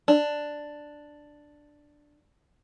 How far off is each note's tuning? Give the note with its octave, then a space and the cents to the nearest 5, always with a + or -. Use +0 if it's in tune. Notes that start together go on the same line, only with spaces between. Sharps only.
D4 +5